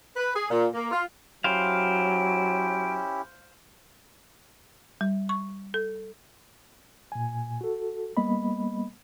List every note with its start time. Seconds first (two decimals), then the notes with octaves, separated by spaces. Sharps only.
0.17 B4
0.35 G#4
0.51 A#2
0.74 A#3
0.91 F4
1.44 F#3 C#4 E4 G4 C5 F5 D7
5.01 G3
5.29 C#6
5.74 A4
7.12 A#2 G#5
7.61 F#4 A4
8.17 G3 A#3 B3 D#5 B5